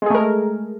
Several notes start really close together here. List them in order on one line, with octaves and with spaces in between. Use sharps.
G#3 G#4 A3 A#4